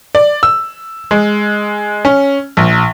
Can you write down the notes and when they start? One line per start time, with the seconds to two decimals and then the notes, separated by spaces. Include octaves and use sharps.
0.15 D5
0.43 E6
1.11 G#3
2.05 C#4
2.57 A#1